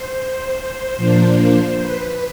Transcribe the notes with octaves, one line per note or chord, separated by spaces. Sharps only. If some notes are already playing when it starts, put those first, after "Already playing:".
Already playing: C5
A#2 F3 A#3 D4
B4